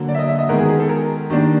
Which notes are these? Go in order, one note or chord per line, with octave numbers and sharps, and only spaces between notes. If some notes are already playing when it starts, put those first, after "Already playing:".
Already playing: D3 F#3 A#3
D5
E5
D#5
E5
D#5
D#3 G#3 B3 A#4
G#4
G#4
A4
A#4
D#3 G3 A#3 D4